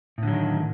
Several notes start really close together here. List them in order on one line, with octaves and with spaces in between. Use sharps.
A2 D3 F#3 D#3